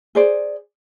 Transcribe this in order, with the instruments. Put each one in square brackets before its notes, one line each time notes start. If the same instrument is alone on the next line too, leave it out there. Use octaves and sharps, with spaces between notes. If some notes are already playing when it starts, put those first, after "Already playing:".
[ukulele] G#4 C5 D5